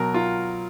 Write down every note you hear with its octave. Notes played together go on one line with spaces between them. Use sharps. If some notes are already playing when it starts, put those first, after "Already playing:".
Already playing: B2 F#3 A#4
F4